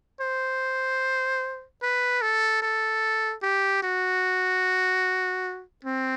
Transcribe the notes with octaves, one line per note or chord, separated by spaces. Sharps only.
C5
B4
A4
A4
G4
F#4
C4